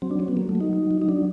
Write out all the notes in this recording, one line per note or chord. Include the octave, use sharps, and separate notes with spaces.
F#3 C4
D4
F#3 C#4
B3
F#3 A#3
A3
F#3
D#4
F#3
F#3
D#4
F#3 D4